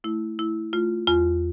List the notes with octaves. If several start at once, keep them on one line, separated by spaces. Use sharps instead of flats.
A3 E4
A3 E4
A3 F4
E2 F4